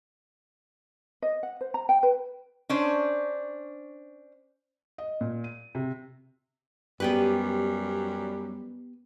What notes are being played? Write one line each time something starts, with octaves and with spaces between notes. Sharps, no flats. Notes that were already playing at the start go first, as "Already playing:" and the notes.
D#5
F#5
C5
A#5
G5
B4
C#4 D4 C5
D#5
A#2
D#7
C3
F#2 G3 B3 G4 B4